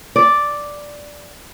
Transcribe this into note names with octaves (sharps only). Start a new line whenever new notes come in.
D5